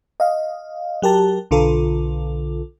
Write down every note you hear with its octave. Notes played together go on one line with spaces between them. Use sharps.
D#5 F5
F#3 G4 A#4 A5
B1 D3 F4 A4